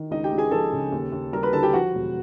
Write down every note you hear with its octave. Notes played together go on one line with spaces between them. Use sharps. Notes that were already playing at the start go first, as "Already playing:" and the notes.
Already playing: D#3
C#2 D#4 D#5
G4 G5
C#2
G#4 G#5
F3 A4 A5
C#3
D#2
D#2
G3 A#4 A#5
B4 B5
D3 A4 A5
G4 G5
F3 F#4 F#5
E1